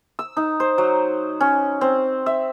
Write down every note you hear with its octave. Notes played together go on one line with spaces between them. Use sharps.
E6
D#4
C5
F#3
C#4
C4
E5